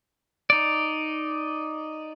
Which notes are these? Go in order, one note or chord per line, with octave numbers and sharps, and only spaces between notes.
D#4 D5